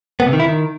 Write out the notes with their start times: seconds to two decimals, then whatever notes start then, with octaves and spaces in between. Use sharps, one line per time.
0.20 B3
0.26 C3
0.33 D#3
0.40 E4
0.46 D#3